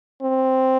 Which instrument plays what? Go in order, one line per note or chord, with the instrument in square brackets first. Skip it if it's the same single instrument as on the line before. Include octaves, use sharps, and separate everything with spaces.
[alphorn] C4